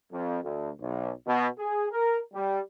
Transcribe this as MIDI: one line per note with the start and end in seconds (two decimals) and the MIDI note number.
0.11 0.38 41
0.43 0.70 38
0.80 1.11 35
1.26 1.46 47
1.58 1.86 68
1.92 2.19 70
2.33 2.60 55